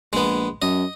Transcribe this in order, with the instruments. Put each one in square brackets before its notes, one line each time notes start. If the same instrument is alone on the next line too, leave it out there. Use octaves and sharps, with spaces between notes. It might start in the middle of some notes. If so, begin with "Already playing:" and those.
[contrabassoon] A#1 [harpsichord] G#3 B3
[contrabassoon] F#2 [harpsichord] D#5